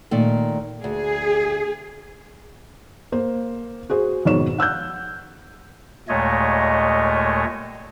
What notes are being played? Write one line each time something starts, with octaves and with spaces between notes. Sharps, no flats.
A#2 D#3 A3
D2 G#4
A#3 C5
F#4 G#4 C5
F2 G#2 B2 D#3 C#5 E7
F#5 E6 F#6 G6
D#2 A#2 G#3 A3 C#5 D#5